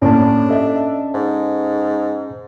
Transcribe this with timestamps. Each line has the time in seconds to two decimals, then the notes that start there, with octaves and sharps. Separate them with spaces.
0.02 A2 A#3 C#4 D4 A5
0.49 A4 D#5 E5
1.14 G#2